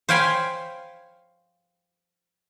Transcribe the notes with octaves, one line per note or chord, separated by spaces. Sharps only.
C5 C#5 F5 G5 G#5 B5